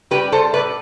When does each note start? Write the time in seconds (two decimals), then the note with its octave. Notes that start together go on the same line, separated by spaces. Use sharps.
0.11 G3 G4 B4
0.32 A4 C5
0.54 A2 B4 D5